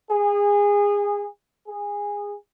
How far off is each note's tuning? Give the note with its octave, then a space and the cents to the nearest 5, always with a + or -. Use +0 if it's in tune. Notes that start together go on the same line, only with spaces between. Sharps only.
G#4 -25
G#4 -20